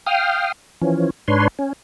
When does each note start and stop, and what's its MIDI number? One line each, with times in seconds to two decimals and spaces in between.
0.06 0.52 77
0.06 0.52 79
0.06 0.52 87
0.06 0.52 89
0.81 1.10 52
0.81 1.10 53
0.81 1.10 61
1.28 1.48 44
1.28 1.48 62
1.28 1.48 71
1.28 1.48 73
1.28 1.48 84
1.59 1.73 61